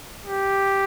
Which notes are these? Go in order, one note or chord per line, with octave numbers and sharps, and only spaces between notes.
G4